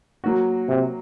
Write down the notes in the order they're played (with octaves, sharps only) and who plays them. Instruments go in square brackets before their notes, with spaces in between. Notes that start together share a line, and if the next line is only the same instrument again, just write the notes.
[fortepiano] F#3 A#3 F#4
[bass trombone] C3